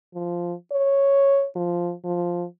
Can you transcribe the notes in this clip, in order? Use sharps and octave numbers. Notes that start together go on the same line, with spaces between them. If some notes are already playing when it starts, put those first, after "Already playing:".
F3
C#5
F3
F3